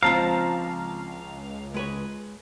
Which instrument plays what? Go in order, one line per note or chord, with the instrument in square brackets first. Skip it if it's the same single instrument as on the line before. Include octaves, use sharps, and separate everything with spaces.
[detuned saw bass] C#2 [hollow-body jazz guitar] F3 C4 F4 [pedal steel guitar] F5 [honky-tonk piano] A5 A#5
[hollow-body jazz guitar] G#3 B4 C#5